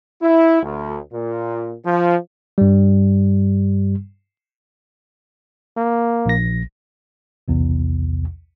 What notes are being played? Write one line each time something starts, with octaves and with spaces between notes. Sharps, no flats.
E4
D2
A#2
F3
G2 G3
A#3
A#1 A#6
B1 E2 C3